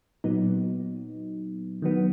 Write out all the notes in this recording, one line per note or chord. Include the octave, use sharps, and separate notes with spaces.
A#2 F#3 B3 D#4
D#3 F#3 B3